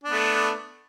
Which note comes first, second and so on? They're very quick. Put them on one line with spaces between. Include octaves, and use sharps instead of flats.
D4 B3 A3